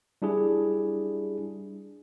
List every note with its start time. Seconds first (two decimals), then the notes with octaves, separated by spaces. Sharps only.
0.22 G3 D4 E4 G#4